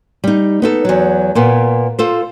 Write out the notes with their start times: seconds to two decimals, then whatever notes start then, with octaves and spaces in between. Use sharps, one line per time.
0.24 G3 D#4
0.62 B3 D#4 A4
0.85 E2 F#3
1.35 A#2 A#3 B3
1.99 F4 A4 C5